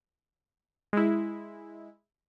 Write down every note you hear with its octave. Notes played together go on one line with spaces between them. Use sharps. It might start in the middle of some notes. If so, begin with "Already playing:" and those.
G#3 E4